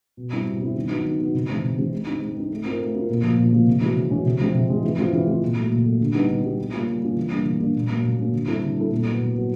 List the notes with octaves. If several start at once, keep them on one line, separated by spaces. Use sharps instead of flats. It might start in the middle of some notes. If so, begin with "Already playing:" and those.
B2
G3 C4 E4
B2
G3 C4 E4
D#3
F#3 B3 D#4
D#3
F#3 B3 D#4
C3
E3 G#3 C4
C3
E3 G#3 C4
G#3
C4 D#4
G#3
C4 D#4
A3
C4 F4 A#4
A3
C4 F4 A#4
A#2
F3 A#3
A#2
F3 A#3
C3
E3 G#3 C#4 F#4
C3
E3 G#3 C#4 F#4
C3
F3 G#3 C4
C3
F3 G#3 C4
E3
G#3 C4 F4
E3
G#3 C4 F4
A#2
F#3 A3
A#2
F#3 A3
D3
G3 B3 D#4 G4
D3
G3 B3 D#4 G4
G3
A#3 C#4 F4
G3
A#3 C#4 F4
E3
G3 A#3 D4
E3
G3 A#3 D4
A#2
F#3 A#3 C#4
A#2
F#3 A#3 C#4
D3
G3 C4 E4 A4
D3
G3 C4 E4 A4
A#2
F#3 B3
A#2
F#3 B3